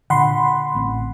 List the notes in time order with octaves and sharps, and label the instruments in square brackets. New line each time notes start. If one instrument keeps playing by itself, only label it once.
[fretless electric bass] A#2 D3 [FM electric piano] F#5 B5 C6
[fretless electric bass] A1 C4